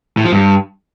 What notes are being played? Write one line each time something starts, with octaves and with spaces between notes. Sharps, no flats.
A2
F3
G2